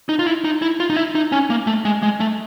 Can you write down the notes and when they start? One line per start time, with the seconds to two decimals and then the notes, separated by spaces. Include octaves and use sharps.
0.09 D#4
0.19 F4
0.27 E4
0.44 D#4
0.62 E4
0.80 F4
0.90 D#4
0.96 E4
1.15 D#4
1.32 C#4
1.50 A#3
1.67 A3
1.85 G#3
2.03 G#3
2.20 A3